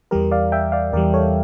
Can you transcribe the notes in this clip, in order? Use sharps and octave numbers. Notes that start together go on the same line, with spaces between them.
E2 E3 G3 G4 A#4
D5 F5
E5 G5
D5 F5
E2 E3 G3 A#4 D5
A4 C#5